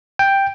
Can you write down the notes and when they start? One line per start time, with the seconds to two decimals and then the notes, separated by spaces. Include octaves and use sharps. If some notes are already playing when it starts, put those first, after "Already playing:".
0.19 G5